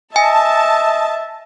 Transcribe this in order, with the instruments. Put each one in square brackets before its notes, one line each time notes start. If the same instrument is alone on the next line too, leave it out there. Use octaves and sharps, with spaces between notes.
[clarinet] D#5 [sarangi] E5 [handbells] G#5 [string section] A5